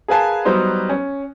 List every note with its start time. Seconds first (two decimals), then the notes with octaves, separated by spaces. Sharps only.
0.08 G#4 A#4 B4 F5 G#5 A5
0.45 F#3 G3 B3 D#4 C5
0.89 C#4